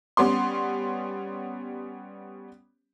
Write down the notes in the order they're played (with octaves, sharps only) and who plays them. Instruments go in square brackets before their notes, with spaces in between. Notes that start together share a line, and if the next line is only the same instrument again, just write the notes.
[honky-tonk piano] G3 B3 C#4 C6